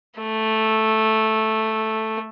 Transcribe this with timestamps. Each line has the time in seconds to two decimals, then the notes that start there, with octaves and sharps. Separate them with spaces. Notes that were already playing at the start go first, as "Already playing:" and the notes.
0.20 A3